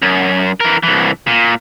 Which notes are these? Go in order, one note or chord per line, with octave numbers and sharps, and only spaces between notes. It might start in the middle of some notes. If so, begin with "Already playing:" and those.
F#2
E3 A#4
C2 E3
A#2